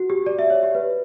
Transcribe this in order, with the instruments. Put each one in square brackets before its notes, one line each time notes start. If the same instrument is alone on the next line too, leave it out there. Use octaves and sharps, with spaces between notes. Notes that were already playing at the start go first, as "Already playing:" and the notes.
Already playing: [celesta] F#4
G4
D5
E5
C#5
G4
B4